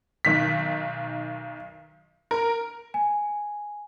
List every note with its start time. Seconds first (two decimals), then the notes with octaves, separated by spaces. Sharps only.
0.25 B1 D#3 B6
2.31 A#4
2.94 G#5